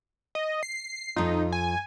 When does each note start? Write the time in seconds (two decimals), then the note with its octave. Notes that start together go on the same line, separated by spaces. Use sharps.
0.35 D#5
0.63 C7
1.16 F2 D#4 F4
1.52 G#5